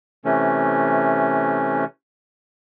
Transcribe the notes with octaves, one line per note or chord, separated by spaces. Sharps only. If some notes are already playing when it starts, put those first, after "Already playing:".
C3 E3 A3 C#4